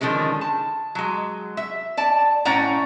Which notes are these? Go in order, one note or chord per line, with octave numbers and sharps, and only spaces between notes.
D3 D#3 F3 G#3 C#4
A5
F#3 G#3
E5
D5 A5
A2 C#4 D5 F#5 G5 A#5